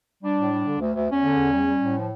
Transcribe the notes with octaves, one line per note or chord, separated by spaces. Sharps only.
G3 D4
A2
G3
D3
D2
D2
E2 C#4
D3
E2
G3
G3
A2
F3